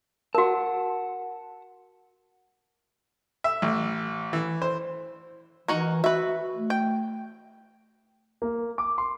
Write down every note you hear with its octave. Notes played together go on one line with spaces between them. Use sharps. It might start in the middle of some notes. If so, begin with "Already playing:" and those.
F#4 A#4 F#5 A5
E5
A1
E3
C5
E3 D#4 F#4 A#4
F#4 B4 E5
A3
G5
A#3
D6
C6